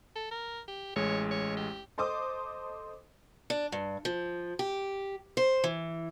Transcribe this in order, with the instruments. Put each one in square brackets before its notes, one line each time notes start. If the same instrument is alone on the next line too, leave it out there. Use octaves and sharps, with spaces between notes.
[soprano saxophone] A4
A#4
G4
[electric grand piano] A1 G#3 [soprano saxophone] C#5
[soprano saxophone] C#5
G4
[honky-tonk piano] A4 C5 D#5 C6 D6 D#6
[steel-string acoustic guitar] D4
G2
F3
G4
C5
E3